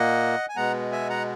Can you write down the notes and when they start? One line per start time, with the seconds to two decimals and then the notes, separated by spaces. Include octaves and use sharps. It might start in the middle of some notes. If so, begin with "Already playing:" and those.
Already playing: A#2 A#3 D#5 F#5
0.49 G#5
0.56 B2 G#3 B3 F#5 A#5
0.92 E5 G#5
1.10 F#5 A#5